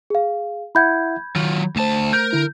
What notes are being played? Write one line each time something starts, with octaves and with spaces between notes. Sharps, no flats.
G#4 F5
E4 E5 F#5 B5 G6 G#6
D#3 F#3 F4
D2 A3 C5 A5
A#4 G6
D3 E4